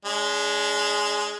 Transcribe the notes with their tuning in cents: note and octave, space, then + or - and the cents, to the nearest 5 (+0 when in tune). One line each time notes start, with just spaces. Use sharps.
G#3 +0 D4 -45